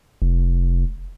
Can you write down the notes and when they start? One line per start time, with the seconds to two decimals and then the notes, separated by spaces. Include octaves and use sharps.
0.22 F1